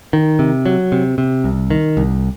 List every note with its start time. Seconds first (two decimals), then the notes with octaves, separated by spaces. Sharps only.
0.13 D#3
0.39 C3
0.66 F#3
0.92 C3
1.18 C3
1.44 C2
1.70 D#3
1.97 C2